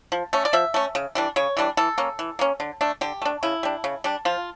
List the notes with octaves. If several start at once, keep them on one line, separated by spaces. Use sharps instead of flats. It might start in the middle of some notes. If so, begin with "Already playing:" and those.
F3
A3 C#4
D5
F3 E5
A3 C#4
C#3
E3 G3 D4
C#3 C#5
E3 G3 D4
E3 A4
A#3 C#4
E3
A#3 C#4
D3
A3 D4
D3 G4
A3 D4
C#3 E4
G3 D4
C#3
G3 D4
F3 F4